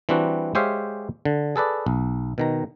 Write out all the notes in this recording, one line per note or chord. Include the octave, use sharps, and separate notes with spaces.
E3 G3 C4 D4 F#4
G#3 G4 C5 C#5 E5 F5
D3
G#4 A4 B4 D5
B1
B2 D#3 A#5